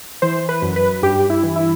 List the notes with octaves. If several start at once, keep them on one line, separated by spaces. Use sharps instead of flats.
E3 C5
B4
F#2
B4
G2 G4
E4
E3
E4